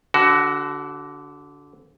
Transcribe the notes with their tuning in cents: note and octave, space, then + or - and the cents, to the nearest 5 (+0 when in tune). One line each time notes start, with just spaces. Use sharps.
D3 -20 F#4 +20